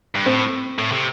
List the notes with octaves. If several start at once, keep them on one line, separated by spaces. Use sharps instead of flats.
G2
A2 C4
A2
C3